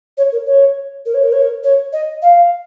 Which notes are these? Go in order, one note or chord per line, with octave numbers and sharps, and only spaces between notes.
C#5
A#4
C#5
A#4
C#5
A#4
C#5
A#4
C#5
D#5
F5